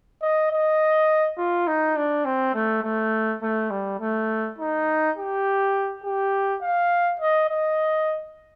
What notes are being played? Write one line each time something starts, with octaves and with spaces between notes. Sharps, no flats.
D#5
D#5
F4
D#4
D4
C4
A3
A3
A3
G3
A3
D#4
G4
G4
F5
D#5
D#5